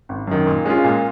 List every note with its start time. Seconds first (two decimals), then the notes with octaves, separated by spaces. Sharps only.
0.09 G#1
0.27 F#2 D#3
0.47 A#2
0.65 G#3 C#4 F4
0.84 A#2